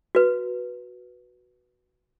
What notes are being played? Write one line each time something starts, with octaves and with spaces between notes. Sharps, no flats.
F#4 B4